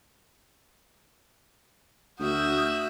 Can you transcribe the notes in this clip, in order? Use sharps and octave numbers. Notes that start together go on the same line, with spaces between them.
D2 F#4 E5 D#6 F6 G6